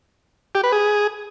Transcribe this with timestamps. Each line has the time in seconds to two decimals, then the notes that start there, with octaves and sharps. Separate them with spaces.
0.55 G4
0.64 B4
0.72 G#4